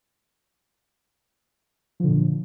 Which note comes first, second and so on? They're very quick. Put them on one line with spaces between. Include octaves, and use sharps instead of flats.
F3 D3 A#2